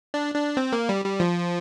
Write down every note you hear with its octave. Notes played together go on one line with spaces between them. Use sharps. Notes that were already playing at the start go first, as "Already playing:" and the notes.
D4
D4
C4
A#3
G3
G3
F3